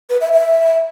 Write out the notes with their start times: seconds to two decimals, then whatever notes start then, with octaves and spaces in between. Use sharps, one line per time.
0.10 B4
0.21 E5
0.32 E5